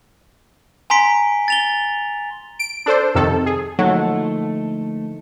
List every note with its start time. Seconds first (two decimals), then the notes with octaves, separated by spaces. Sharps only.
0.90 G#5 A#5 C6 B6 D7
1.48 A6 F7 G7
2.59 D7
2.86 D4 A4 C5
3.15 F2 C3 D#3 A4
3.46 G#4
3.79 D2 F3 F#3 A3 A#3 D#4 A4